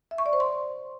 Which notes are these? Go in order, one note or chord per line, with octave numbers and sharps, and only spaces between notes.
E5
C#6
D5
C5
C6